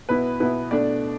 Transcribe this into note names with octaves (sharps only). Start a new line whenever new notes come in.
B2 B3 E4 B4
B2 B3 E4 B4
B2 A3 D4 D5